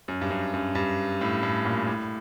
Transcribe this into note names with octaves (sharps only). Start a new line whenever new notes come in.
F#2
G2
F#2
F#2
G2
A2
A2
A#2
A2